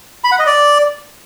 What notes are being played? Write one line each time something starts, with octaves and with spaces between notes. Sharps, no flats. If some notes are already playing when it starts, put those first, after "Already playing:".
B5
F#5
D#5
D5